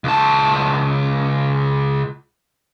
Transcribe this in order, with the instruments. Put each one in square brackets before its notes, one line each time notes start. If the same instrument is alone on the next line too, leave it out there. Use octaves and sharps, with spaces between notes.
[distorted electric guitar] C#2 A5